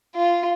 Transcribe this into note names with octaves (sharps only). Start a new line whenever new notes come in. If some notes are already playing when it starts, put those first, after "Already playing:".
F4